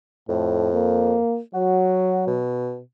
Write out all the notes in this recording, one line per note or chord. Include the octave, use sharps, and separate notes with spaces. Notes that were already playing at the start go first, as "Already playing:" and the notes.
F2 A2
A#3
F#3 F#4
B2